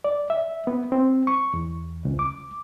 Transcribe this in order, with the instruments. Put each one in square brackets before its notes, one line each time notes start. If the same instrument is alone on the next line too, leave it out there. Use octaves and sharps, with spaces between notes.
[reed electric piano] D5
E5
B3
C4
C#6
E2
C#2
D6